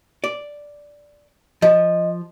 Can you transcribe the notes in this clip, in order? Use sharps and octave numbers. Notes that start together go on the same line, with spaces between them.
D5
F3 D#5